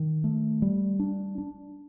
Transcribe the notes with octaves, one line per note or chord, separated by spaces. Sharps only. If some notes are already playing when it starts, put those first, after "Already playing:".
Already playing: D#3
A3
G3
D4
D4